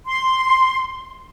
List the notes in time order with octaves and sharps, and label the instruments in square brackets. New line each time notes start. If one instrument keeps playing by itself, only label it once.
[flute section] C6